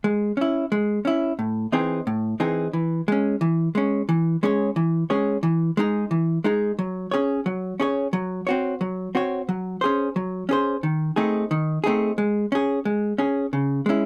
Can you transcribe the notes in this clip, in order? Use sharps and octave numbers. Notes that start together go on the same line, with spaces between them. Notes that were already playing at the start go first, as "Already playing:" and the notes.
G#3
C#4 E4
G#3
C#4 E4
A2
E3 C4 D#4 G#4
A2
E3 C4 D#4 G#4
E3
G#3 C#4
E3
G#3 C#4
E3
G#3 C#4 G#4 C#5
E3
G#3 C#4 G#4 C#5
E3
G#3 D#4 G#4
E3
G#3 D#4 G#4
F#3
C#4 G#4 C#5
F#3
C#4 G#4 C#5
F#3
C4 F#4 C#5
F#3
C4 F#4 C#5
F#3
C#4 G#4 C5
F#3
C#4 G#4 C5
D#3
A3 C4 D#4 G#4
D#3
A3 C4 D#4 G#4
G#3
C#4 G#4
G#3
C#4 G#4
C#3
G#3 C#4 E4